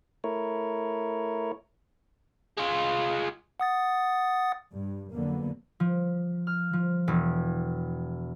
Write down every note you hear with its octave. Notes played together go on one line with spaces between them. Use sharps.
A3 E4 A#4 C#5
G#3 F4
F#5 D#6 A6
G2
F2 D3 F#3 A#3 B3
F3
F6
F3
E1